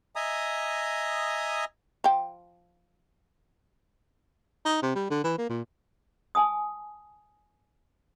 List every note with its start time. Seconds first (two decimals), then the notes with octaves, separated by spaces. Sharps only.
0.16 D#5 E5 G#5 A#5 D#6
2.04 F3 G5
4.65 D#4
4.83 C3
4.96 G3
5.10 D3
5.24 E3
5.38 A#3
5.49 A#2
6.35 G#5 A5 D#6